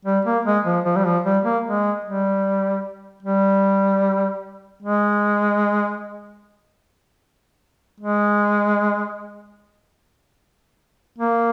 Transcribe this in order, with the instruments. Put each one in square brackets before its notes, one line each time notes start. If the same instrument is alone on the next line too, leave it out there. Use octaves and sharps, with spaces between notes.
[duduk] G3
A#3
G#3
F3
F3
G3
F3
G3
A#3
G#3
G3
G3
G#3
G#3
A#3